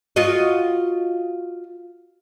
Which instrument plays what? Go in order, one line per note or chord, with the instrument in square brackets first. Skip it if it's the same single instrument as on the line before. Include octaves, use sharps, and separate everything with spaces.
[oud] F4 F#4 D#5